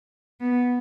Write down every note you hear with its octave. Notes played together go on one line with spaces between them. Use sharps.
B3